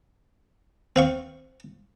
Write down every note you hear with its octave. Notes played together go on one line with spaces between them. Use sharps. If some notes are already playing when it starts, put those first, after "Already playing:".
C4 F5 C#6